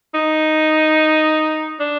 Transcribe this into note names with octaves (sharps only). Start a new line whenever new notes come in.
D#4
D4